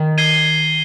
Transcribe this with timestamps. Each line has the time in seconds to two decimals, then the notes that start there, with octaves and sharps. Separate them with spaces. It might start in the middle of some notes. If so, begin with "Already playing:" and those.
Already playing: D#3
0.18 G#6 C7 D#7 G7